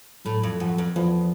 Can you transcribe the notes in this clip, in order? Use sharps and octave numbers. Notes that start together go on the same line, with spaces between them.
A2 F#3
F2
F#2 F3
F2
E2 F3